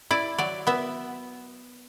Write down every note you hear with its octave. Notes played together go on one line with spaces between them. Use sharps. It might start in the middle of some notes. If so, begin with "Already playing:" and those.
E4 D5
F#3 D5
B3 E5